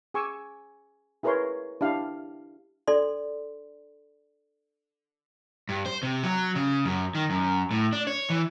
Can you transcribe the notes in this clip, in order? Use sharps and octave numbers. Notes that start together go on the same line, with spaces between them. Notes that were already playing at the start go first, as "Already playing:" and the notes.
G#4 G#5 C#6 D6 E6
E4 G#4 A#4 B4 C#5 C6
D4 E4 G4 F5
D4 A4 D5 C6
G2
C5
C3
F#3
C#3
F#2
D#3
F#2
A2
D4
C#5
E3